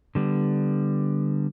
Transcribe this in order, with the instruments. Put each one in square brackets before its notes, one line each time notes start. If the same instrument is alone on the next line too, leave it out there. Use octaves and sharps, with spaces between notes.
[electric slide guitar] D3 G3 B3